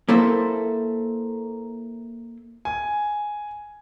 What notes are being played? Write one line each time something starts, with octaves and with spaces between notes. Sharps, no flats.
A#3 E4 A4 C5
G#5